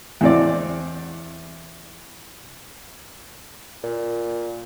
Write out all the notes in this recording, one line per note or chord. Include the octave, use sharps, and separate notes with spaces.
E2 C4 D5
A#2